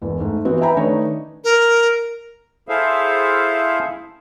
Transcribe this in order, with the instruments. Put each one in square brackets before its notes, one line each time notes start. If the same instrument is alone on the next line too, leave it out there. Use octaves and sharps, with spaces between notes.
[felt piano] E1 E2
G#2 A3
E3 B3 C4 F#4 B4
E4 B4 G5 G#5 A#5 B5
D#3 A3 D4 D#4 B4 C#5
[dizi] A#4
[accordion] E4 G#4 A4 C5 E5 F5